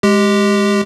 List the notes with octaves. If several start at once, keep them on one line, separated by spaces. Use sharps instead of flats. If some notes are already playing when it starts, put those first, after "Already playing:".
G#3 G4